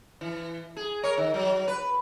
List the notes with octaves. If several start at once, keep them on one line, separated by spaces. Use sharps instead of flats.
E3
G#4
A#4 C#5
D#3
F#3
B4